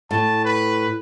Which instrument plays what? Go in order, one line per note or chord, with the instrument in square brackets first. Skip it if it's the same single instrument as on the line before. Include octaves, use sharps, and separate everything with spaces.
[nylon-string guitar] A2 [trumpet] A5
[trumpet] B4